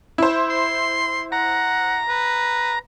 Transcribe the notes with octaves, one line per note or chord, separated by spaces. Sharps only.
E4 C5
C6
F#5 A#5
B4